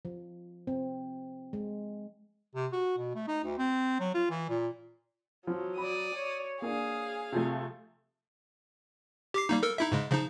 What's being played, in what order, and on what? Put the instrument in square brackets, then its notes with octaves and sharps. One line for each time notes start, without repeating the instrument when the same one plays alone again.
[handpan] F3
C4
G#3
[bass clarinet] C3
F#4
B2
A3
D#4
D2
C4
F#3
F4
E3
A#2
[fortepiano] F3 [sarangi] F#3
[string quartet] D5 D#6 [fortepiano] B5
[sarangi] C#5
[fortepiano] A#3 D4 [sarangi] G#4 [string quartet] F5
[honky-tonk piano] C3 F3 A3
[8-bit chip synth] G4 D6 C7
G3 A#3 D#4
A4 A#4 E6
D#4 E4 E5
G#2 C#3 G#3
C#3 F3 D#4